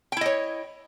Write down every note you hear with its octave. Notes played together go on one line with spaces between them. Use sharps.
E4 C#5 D#5 G5